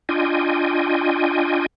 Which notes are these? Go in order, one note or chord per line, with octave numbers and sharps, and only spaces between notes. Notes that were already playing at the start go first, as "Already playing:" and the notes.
D4 F4 D#5 G5 G#5